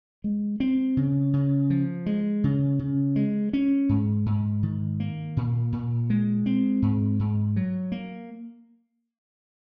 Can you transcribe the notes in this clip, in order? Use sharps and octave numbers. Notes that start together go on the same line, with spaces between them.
G#3
C4
C#3
C#3
F3
G#3
C#3
C#3
G#3
C#4
G#2
G#2
D#3
A#3
A#2
A#2
G#3
C4
G#2
G#2
F#3
A#3